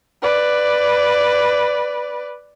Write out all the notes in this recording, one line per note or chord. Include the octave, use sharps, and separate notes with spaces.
B4 D5